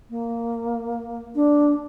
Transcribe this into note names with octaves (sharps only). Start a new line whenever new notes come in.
A#3
D4